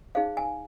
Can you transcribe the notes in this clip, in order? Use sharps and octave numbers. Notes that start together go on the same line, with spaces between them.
D#4 G#4 C5 F5
G#5